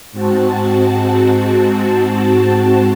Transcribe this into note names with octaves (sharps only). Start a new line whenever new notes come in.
G#2 C4 F#4 A5